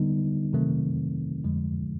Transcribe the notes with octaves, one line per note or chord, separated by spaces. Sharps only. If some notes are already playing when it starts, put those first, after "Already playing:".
Already playing: D3 G3 B3 D#4
C3 D#3 F#3 A3 C4
F2 D3 F3 G#3